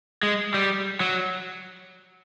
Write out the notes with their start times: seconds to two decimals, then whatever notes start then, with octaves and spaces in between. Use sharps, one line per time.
0.23 G#3
0.54 G3
1.00 F#3